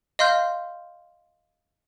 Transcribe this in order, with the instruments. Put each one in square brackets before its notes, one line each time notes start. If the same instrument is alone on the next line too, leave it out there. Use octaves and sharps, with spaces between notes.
[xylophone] D#5 F5 C6 F6 G6